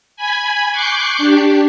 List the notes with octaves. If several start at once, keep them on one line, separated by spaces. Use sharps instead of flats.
G#5 B5 G#6
C#6 D6 F#6 G6 C7
D4 G4